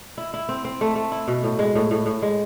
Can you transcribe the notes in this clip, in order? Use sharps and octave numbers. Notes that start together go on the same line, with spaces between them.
E4
E4
C4
C4
A3
A3
E4
B2
A2
G#3
A2
A2
A2
G#3